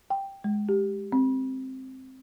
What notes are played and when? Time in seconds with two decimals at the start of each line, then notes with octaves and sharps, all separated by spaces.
0.10 G5
0.44 G#3
0.69 G4
1.12 C4